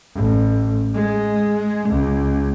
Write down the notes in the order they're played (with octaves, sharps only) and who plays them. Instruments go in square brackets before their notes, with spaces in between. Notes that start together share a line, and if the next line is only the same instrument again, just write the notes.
[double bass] A1
G#3
C#2